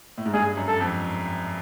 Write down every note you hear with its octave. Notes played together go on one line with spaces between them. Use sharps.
A2
G#2
G2 G#4
F#2
A4
F2